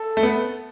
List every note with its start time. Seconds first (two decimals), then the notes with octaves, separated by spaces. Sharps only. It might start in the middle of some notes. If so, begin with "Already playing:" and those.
Already playing: A4
0.17 A3
0.23 B3